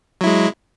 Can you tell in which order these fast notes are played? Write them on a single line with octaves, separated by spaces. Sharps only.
F#3 E4 G#3